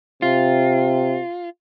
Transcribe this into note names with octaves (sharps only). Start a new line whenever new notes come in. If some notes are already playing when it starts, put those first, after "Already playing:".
C3 F4